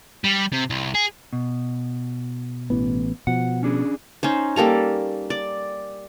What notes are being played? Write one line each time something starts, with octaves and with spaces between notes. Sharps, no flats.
G3
C3
C2
G#4
B2
A1 E3 B3
B2 F3 F#5
C#4 D4 G#4
C#4 D#4 C5
G3 A#3 A4 A#5
D5